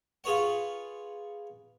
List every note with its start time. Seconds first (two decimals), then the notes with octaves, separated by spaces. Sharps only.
0.24 F4 G#4 B4 C#5 F#5